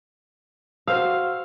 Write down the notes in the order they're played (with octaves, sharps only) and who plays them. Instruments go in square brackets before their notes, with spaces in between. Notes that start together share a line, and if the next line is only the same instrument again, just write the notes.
[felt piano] F#4 C5 E6 [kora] F5